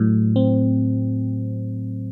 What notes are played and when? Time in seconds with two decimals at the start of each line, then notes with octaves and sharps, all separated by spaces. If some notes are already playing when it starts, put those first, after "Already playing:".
Already playing: A2 F#3
0.36 C4